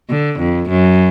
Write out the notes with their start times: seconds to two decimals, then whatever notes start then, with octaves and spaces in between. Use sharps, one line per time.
0.10 D3
0.39 F2
0.69 F#2